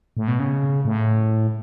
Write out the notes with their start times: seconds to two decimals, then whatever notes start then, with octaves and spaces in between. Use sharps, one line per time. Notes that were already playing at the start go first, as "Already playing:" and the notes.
0.17 A2
0.28 B2
0.39 C#3
0.85 A2